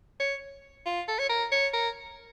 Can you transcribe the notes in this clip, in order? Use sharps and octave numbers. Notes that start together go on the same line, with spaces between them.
C#5
F4
A4
C#5
A#4
C#5
A#4